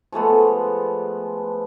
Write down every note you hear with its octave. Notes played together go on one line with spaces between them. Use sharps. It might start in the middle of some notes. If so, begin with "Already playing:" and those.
F3 G#3 A3 B3